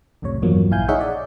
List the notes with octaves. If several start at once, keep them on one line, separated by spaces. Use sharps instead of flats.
C2 F2 A2 C3 C#5
E2 G2 F3 F#3 A#3
A#1 E4 F5 G#5 G6
D#4 G#4 C#5 E5 F#5
D5